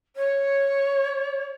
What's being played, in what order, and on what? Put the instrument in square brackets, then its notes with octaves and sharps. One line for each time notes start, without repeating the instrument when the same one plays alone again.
[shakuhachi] C#5